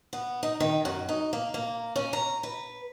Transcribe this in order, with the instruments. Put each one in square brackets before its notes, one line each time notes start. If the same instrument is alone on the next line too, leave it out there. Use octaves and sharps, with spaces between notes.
[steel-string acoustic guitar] B3
D#4
D#3
F#2
D#4
A#3
A#3
C#4
A#5
B4